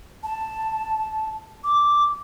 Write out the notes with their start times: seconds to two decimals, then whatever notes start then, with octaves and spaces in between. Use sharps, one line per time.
0.23 A5
1.64 D6